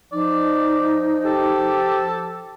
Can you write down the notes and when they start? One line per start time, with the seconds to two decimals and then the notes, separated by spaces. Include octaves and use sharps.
0.12 F3 D#4 D5
1.25 G4 A4